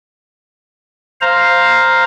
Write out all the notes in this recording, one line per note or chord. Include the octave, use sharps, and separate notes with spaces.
C5 F5 A#5